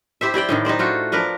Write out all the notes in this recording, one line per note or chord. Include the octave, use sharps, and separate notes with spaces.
E4 G4 C5 E5
E4 G4 D5 G5
A2 D3 D#3
D#4 G4 C5 D5
A3 F4 F#4
F3 D4 A#4 B4